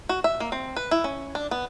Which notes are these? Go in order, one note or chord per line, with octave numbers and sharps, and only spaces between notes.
F#4
E5
A#3
C4
B4
E4
C#4
D4
B3